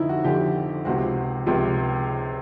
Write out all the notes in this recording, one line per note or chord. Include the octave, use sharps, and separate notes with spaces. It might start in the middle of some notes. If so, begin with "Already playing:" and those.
Already playing: F2 D3 F3 D#4 E4
F#4
F2 D3 F3 G4
C#2 C3 F3 F#4
C#2 C3 F3